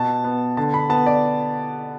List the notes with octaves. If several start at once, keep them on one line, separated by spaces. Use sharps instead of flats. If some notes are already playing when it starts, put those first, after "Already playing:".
Already playing: B2 A5
B3
D3 A5
B5
B3 A5
D5